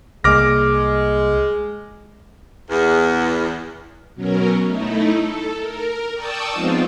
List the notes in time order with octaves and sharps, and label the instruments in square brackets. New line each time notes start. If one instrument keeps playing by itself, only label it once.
[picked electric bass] C2 A#3 [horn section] G#3 [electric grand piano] D6 F6 A#6
[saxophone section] E2
[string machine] B2 F#3 C#4 A#4
A3 D#4 E4
A4
A#4
D5 G5 A5 C#6 D#6 E6
F3 G#3 B3 C4 D#4 F4